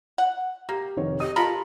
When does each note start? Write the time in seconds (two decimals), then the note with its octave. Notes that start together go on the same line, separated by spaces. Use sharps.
0.18 F#5
0.69 A#3 G4
0.97 F1 D#3 C#5
1.20 G4 D#5 D#6 D#7
1.36 F4 A4 A#4 B5